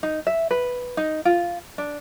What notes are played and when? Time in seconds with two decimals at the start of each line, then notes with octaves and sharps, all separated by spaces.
0.03 D#4
0.27 E5
0.51 B4
0.97 D#4
1.25 F4
1.78 D4